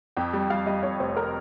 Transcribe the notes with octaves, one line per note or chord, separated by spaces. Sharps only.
F2 G5
G3
G3 F5
G3 D#5
F2 C#5
F1 C5
A#4